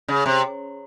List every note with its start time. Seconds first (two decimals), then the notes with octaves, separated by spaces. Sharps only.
0.08 C#3
0.26 C3